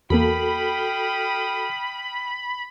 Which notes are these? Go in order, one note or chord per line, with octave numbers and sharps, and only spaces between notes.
E2 A#3 F#4 A4 F5 G5 B5 D#6